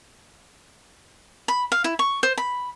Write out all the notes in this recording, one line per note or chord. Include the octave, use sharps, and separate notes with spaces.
B5
F5
E4
C#6
C5
B5